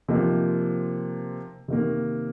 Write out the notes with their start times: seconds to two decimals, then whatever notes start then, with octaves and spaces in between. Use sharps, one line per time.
0.08 C3 F3 A#3 D#4
1.68 C3 D#3 A#3